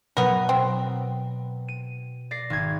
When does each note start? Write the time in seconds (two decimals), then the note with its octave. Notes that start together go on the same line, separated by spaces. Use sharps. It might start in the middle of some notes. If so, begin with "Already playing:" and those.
0.17 B2 F#3 B3 A#4
0.49 C4
1.68 D#7
2.31 D5 A#6 C7
2.50 G#1 G#6